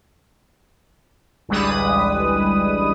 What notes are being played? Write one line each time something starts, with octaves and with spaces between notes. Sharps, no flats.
A1 D2 G3 G#3 B4 D#6